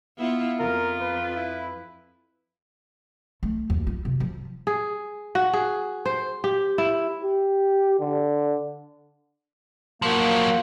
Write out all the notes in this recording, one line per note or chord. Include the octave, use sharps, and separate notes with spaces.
B3 E4 F4
F2 F4 A#4
B4
E4
A3
D#2
F4
C3
F3
G#4
F#4
G#4
C5
G4
E4
G4
D3
F3 F#3 A#3